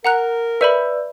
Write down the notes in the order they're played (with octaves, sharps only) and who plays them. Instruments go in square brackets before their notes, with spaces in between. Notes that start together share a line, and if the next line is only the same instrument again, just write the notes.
[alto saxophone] A#4 [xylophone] F#5 A#5 F#6
[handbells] B4 D5 [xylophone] E5 B5